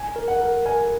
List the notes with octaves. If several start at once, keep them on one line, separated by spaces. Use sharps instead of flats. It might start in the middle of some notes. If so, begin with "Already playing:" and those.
Already playing: G#5
A#4
F#5
A#4
A#4 G#5